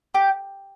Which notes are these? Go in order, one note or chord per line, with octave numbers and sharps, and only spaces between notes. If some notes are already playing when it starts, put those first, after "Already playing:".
G4